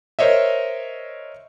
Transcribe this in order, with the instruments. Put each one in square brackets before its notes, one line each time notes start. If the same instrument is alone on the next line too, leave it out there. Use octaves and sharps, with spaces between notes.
[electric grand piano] A#4 C5 C#5 D#5 E5